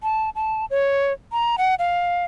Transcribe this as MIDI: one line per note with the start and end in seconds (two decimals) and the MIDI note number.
0.03 0.30 81
0.36 0.65 81
0.71 1.13 73
1.32 1.56 82
1.58 1.75 78
1.79 2.25 77